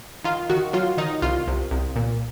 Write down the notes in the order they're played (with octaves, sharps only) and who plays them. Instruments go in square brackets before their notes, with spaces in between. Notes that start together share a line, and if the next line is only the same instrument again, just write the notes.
[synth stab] D#3 F4
D#3 F#4
F#3 F4
D#3 D#4
C2 F4
C2
C2
A#2